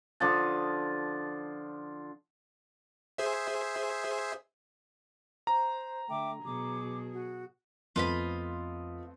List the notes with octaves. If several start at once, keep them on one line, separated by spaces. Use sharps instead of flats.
D3 F3 A5
G#4 C5 E5
C5 A#5
D3 A3 E5 G5 D6
B2 F#3 G#4 D6
F#4
F2 A3 B3 C4 F4 D#5 B5